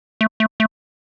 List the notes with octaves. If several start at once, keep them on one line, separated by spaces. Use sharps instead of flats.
A3
A3
A3